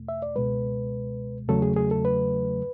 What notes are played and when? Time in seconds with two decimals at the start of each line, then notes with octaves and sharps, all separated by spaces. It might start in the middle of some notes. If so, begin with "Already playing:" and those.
Already playing: E2 B2 A3
0.09 E5
0.22 D5
0.36 C#2 B2 G#3 B4
1.48 E2 C#3 F#3 A3 A4
1.62 G#4
1.76 G#4
1.91 A4
2.05 B4